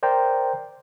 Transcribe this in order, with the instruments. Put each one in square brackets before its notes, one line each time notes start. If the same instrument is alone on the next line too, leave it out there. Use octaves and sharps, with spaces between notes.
[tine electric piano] A#4 C5 D5 G5 A#5